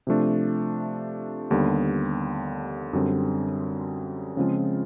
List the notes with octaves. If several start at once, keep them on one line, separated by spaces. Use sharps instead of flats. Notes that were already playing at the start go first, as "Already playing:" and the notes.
C3 F3 A3 D4
D#2 D3 G3 B3
F#2 D3 G3 C4
C#3 F3 G#3 C4 F4